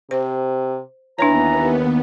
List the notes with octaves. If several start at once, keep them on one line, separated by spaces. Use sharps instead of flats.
C3 C5
D#2 E3 B3 D4 B4 C#5 A#5